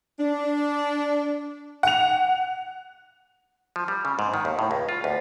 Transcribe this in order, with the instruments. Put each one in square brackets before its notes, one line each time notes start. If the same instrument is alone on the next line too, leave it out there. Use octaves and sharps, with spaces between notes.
[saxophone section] D4
[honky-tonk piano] F#5 F7
[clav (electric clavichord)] F3
G3
C#3
G#2
D#3
D#2
A2
C#2
F4
D2